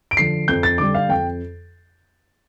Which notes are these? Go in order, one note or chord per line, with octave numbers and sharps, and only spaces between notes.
D7
D3 F3 C7
F2 G6
A6
D3 G3 D6
F5
F2 G5